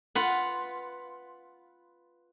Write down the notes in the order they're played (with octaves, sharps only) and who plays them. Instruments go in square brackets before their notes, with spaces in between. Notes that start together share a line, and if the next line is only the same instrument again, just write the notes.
[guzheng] F4 B4 F#5